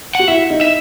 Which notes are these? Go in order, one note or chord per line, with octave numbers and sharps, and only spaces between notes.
F#4 F#5
E4 E5
D#4
E5